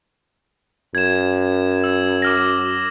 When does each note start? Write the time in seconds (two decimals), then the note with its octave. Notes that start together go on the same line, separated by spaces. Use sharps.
0.95 F#2 G#6 E7
1.84 E6
2.22 D6 F6 A#6